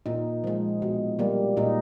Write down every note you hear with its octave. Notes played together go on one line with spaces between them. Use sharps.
A#2 D#4
F3 G#3
B2
G3 A#3
A#2 D#4